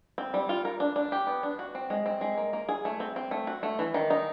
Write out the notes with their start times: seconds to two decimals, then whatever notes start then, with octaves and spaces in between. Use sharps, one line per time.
0.18 C4
0.34 G3
0.49 F4
0.65 A#4
0.80 D4
0.96 D4
1.12 G4
1.27 B3
1.43 D4
1.59 F#4
1.75 C4
1.90 G#3
2.06 C4
2.21 G#3
2.38 A#3
2.53 A#3
2.69 G#4
2.85 A3
3.00 C4
3.16 C4
3.31 A3
3.47 F#4
3.63 A3
3.79 E3
3.94 D#3
4.10 D#4